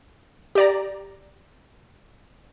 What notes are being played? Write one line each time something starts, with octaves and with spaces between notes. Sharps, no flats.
G4 D5 A#5